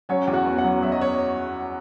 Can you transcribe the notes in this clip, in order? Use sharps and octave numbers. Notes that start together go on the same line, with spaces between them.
F#3 C#4 C#5
E2
F#4 F#5
B3
F#4 F#5
F#3
F#3 E5
D#5
C#5